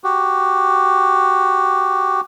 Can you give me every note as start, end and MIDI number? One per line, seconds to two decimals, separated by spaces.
0.04 2.21 66
0.04 2.21 67